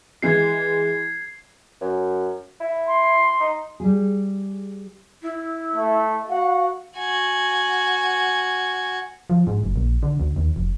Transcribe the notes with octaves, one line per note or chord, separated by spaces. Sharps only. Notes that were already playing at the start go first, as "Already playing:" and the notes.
E3 G#3 G#6 C7
F#2
E4
C6
D#4
G3 G#4
E4
A3 E5
F#4 F5 F#5
F#4 G#5
F3
G#2
F#1
A#1
D3
D2
D#2
F1